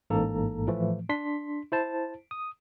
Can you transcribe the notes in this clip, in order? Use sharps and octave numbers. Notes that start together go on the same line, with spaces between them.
A1 G#2 A#3 A4 A#5
A2 E3 F3 A3
D4 C6 B6
E4 C5 A5
D#6